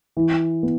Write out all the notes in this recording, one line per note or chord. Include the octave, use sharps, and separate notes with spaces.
E3
B3